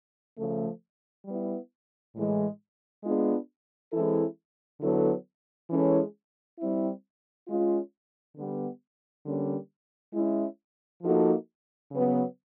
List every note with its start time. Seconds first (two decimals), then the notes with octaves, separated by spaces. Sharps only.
0.37 C#3 F3 A3
1.25 G3 B3 E4
2.14 A2 E3 G#3
3.03 G#3 B3 D4 F4 G#4
3.93 E3 G#3 C4 E4 A4
4.81 D3 F#3 B3 E4 A4
5.69 E3 G#3 C#4 E4 A4
6.58 G3 C4 E4
7.47 G#3 C#4 F4
8.36 D3 G3 B3
9.25 D3 G3 A#3 C#4
10.14 G#3 C#4 E4
11.03 F3 A#3 D#4 F#4 A4
11.92 C#3 F#3 B3